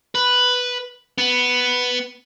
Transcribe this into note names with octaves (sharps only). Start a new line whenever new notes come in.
B4
B3